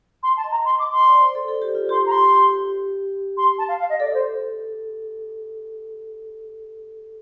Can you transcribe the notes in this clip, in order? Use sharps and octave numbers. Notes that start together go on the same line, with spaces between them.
C6
A5
D#5
A#5
C6
D6
C6
D5
C5
A4
A4
G4
F4
G4 C6
A#5
C6
G4
C6
A5
F5
F5
D#5
A4 D5
C5